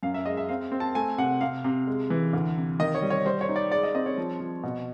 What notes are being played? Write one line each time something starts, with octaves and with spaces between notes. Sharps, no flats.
F#2 F5
E5
G#3 D#5
E5
C4 F5
C4
A5
A3 G#5
C3 F#5
C3 F5
C3
G#3
E3
D2
C3
D#3 D#5
C#5
G3
C#5
G3 C5
C#5
D#4
D5
G#3 D5
D#5
C4 D#5
C#5
F3
F3
B2